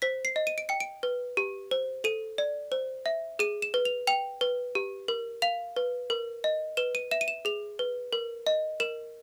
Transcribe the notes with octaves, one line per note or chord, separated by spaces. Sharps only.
C5 B6
C7
D#5
D#7
D7
G5 C#7
D7
B4
G4
C5
A4 D#7
D5
C5
E5
G#4 D#7
E7
B4
F7
G5 F7
B4
G4
A#4
F5 F7
B4
A#4
D#5
B4 E7
D#7
E5 E7
D#7
E7
G#4 F7
B4
A#4
D#5
A#4 E7